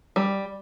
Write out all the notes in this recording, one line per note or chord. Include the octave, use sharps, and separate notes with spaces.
G3